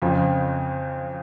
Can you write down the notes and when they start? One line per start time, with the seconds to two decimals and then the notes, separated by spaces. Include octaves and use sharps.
0.02 F2 C#3 F3 C4